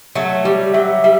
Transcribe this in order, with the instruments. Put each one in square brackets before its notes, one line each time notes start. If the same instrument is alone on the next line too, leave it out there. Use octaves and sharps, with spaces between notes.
[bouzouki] F#3 A3 [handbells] E5
[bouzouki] G3 [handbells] G4
[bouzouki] F#3 [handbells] E5
[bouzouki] G3 [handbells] E5